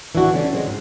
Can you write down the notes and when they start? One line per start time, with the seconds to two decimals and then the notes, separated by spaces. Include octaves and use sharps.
0.15 E3 D4 F#4
0.34 D3 C#4 D4
0.53 G#3 A3 C4
0.67 G#2